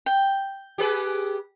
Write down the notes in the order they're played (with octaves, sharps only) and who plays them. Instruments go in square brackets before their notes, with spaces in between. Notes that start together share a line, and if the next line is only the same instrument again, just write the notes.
[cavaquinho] G5
[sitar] G4 G#4 B4